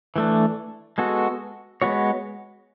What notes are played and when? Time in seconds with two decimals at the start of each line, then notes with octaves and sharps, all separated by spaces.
0.16 E3 A3 D4
0.98 G#3 B3 F#4 A4
1.82 G#3 B3 F#4 C#5